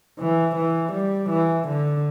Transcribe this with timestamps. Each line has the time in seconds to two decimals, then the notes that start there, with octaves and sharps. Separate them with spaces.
0.19 E3
0.56 E3
0.93 G3
1.30 E3
1.68 D3